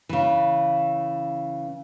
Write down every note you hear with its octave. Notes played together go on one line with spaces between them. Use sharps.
C#3 E3